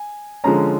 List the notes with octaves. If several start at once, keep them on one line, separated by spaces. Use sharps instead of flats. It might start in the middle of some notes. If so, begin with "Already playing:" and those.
Already playing: G#5
D3 F3 G#3 C#4 A#5